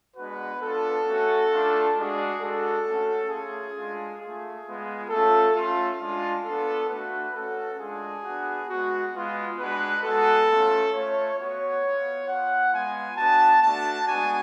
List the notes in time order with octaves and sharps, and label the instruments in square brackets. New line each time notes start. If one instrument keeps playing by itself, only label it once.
[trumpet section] G#3 B3 D4 F#4 B4
B3 D4 F4 A4
A3 C#4 F#4
A3 D4 F4
G#3 D4 F#4 G#4
G#3 D4 F#4 A4
A3 C#4 F#4
A3 C#4 F4 G#4
G#3 D4 F4
A3 F4 G#4
G#3 B3 F4
A3 C#4 F4 A4
A3 C#4 F4
G#3 D4 F4
B3 D4 F4 A4
A3 D4 F#4 B4
A3 C#4 F#4 A4
G#3 D4 F4 G#4
B3 D4 F#4
G#3 B3 F#4
G#3 B3 F4
G#3 D4 F#4 B4
G#3 B3 F#4 A4
A3 C#4 F4
A3 F4 C#5
B3 F#4 C#5
B3 F4
B3 F4 F#5
G#3 B3 F4 G#5
B3 D4 F#4 A5
A3 D4 F#4 A5
G#3 B3 D4 F#4 G#5